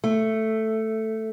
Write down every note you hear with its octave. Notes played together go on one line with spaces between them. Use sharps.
A3